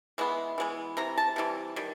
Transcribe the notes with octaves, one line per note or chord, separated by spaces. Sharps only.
E3 G#3 B3
E3 G#3 B3
C3 E3 A#5
A5
C3 E3 G3
D#3 G3